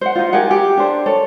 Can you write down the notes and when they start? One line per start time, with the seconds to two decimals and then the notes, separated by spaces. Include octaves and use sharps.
0.01 C5 F#5
0.16 D#4 F4
0.33 G4 G#4 A#4 F#5
0.51 G4
0.77 D4 A4 C5
1.06 A4 C#5